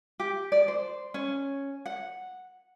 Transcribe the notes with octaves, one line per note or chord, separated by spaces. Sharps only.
G4
D5
C5
C#4
F#5